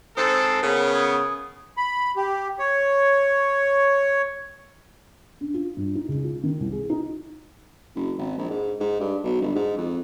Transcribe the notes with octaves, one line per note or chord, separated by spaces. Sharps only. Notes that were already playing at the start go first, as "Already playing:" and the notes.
G#2 C4 A4 D#6 E6 A6
C#3 B3 A#4
D#6 G#6
B5
G4
C#5
D4
F4
G2
D#4
C#2
F4
D#3
C2
G#4
D#4
F#1
G#1
A#1
G#2
G#2
G2
B1
G1
G#2
F2